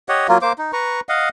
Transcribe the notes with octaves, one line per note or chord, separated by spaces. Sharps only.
G4 C#5 D#5 F#5
F#3 A#3 F4
A#3 C5 D6
D#4
B4 A#5 C#6
D#5 F5 F#5